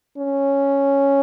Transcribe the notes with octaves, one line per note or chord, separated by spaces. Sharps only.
C#4